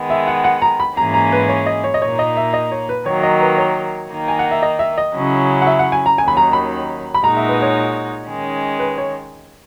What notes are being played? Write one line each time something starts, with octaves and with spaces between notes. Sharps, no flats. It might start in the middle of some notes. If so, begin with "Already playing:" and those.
Already playing: D#3 G#3 B3
E5
F#5
F#5
A#5
B5
G#2 E3 A#3 C#4 G#4 A#5
A#5
B4
C#5
D#5
C#5
D#5
A#2 A#3 D#4 C#5
D#5
E5
D#5
C#5
B4
D#3 F#3 A#3 C#5
D#5
B4
C#5
D#3 A#3 D#4
G#5
F#5
E5
D#5
E5
D#5
C#3 F#3 C#4 E4
F#5
E5
F#5
G#5
A#5
D#2 D#3 F#3 C#4 G#5
B5
A#5
B5
B5
A#2 G#3 D#4 F#4 A#5
E5
B4
C#5
D#3 G#3 C#4
B4
C#5